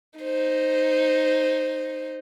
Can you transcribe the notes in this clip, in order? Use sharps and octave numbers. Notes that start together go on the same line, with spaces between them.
D#4 C5